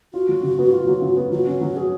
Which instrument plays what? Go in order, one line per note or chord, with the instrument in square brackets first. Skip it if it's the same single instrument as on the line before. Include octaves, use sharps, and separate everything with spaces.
[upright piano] F4 [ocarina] F#4
[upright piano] F#3
C#3
B3
F4
F#3
C#3
B3
[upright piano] F#3 [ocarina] F#4
[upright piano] C#4
F#3
G#4